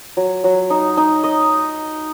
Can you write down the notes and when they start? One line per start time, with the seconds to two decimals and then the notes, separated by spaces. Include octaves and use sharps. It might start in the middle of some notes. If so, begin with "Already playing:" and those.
0.17 F#3
0.44 F#3
0.70 D#4
0.97 D#4
1.24 D#5